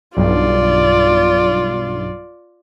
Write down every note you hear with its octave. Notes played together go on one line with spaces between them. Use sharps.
B1 G2 F4 D5